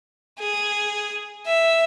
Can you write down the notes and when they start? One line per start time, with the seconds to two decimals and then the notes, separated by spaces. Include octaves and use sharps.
0.39 G#4
1.46 E5